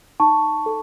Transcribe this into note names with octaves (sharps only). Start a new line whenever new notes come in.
D#4 A5 C#6
A4